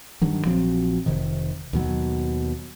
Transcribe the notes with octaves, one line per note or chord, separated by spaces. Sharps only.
G2 D#3 F#3
A#1 F3 F#3 C4
F1 C3 D#3
D#2 B2 F#3